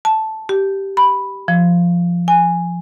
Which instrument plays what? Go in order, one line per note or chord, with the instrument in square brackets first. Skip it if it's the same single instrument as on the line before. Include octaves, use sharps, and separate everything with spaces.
[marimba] A5
G4
B5
F3
G#5